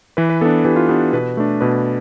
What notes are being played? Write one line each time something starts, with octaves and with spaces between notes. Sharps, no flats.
E3 B4
B4
B3 D4 A4
E3 G4
F4
B3 D4 G4
B2 B4
A3 D4
B2 B4